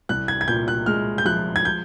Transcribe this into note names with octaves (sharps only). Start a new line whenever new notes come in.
C2 F#6
G#6
G#6
A#2 G6
F#6
G#3 F6
G6
F3 F#6
G#6
G6